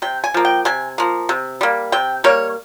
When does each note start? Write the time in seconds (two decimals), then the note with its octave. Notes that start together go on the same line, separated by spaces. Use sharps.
0.02 C3 G5
0.24 G#5
0.34 F3 A#3
0.45 G5
0.65 C3 G#5
0.98 F3 A#3
1.29 C3
1.61 G3 A#3
1.92 C3 G5
2.24 G3 A#3 C#5